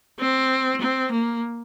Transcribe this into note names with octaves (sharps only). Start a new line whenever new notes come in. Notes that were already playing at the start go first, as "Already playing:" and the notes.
C4
C4
A#3